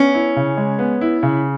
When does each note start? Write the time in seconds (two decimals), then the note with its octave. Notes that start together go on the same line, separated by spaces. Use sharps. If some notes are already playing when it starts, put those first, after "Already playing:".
Already playing: B3 C#4
0.14 E4
0.36 C#3
0.57 G#3
0.79 B3
1.01 E4
1.23 C#3